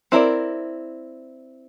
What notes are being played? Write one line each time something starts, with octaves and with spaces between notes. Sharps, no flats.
C4 E4 A#4 D5